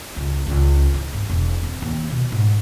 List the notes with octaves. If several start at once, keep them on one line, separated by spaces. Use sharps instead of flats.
C#2
C#2
E3
G1
E1
C4
D#2
B2
G#2